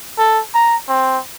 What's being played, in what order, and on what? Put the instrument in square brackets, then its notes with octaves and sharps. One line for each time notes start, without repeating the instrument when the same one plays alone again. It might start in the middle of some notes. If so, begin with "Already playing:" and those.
[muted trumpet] A4
A#5
C4